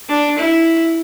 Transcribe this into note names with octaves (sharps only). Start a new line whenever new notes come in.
D4
E4